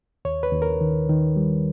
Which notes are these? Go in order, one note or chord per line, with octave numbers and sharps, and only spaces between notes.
D#2 C#5
B4
D#2
A#4
D#3
D#3
G3